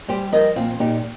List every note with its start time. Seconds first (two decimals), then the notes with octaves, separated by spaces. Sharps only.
0.08 G3 G4 C5
0.32 F3 A#4 D#5
0.56 A#2 C4 F4
0.79 A#2 D#4 G4